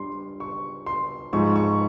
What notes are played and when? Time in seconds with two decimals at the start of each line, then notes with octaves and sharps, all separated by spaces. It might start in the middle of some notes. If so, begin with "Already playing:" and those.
Already playing: G2 G3 C6
0.40 C#6
0.86 C6
1.33 G#2 F3 G#3 C#6
1.56 C#6